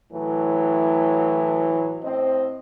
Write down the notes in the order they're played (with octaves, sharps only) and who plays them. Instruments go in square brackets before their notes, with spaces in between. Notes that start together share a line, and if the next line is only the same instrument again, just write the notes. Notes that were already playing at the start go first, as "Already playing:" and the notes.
[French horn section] A2 E3 F#3 A3
A2 C4 C5 D#5